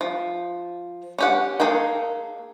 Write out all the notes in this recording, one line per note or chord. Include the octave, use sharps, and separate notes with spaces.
F3
C#4 G4 F#5
A#3 G#4 A4 G5